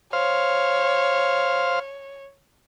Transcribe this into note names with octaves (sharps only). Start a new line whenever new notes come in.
C5 C#5 F5